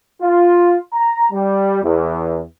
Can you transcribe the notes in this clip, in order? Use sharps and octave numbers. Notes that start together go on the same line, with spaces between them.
F4
A#5
G3
E2